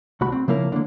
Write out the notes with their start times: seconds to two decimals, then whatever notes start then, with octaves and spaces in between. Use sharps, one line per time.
0.21 C2 A3 F#4 B5
0.32 C4
0.48 C#3 F3 A#3 E4 A#4
0.72 D3 A#3